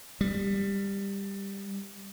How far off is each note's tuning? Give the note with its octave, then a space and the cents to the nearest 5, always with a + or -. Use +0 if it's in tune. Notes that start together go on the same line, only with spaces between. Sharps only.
G3 +15